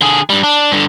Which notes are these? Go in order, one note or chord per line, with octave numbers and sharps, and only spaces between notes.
D3 G#4
G2 G3
D4
G2 D3